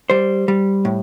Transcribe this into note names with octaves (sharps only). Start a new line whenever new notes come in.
G3 C5
G3
A2